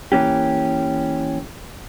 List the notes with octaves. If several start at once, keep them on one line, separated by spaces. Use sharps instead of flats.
E3 A#3 C#4 G4